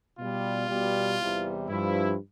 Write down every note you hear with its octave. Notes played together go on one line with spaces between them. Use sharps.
B2 G3 F4
B2 G3
E2 C3 E3 G3
G2 F3 E4